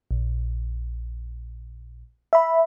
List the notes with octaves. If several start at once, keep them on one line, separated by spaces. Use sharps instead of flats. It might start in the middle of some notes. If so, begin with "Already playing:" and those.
A#1
E5 B5